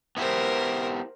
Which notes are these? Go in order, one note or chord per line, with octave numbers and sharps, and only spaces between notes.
B3 E4 G4 A#4 C5